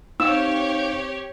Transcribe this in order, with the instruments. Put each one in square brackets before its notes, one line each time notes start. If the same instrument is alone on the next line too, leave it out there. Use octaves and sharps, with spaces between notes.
[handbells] C4 G5 [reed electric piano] D#4 F5 [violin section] G4 C#5 [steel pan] E6